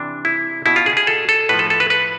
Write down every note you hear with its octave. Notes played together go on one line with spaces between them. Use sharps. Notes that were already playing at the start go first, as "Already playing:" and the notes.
Already playing: C3 E3 D4
E4
B2 E4
F4
G#4
G#4
A4
A4
A2 F3 B4
A4
A4
B4
B4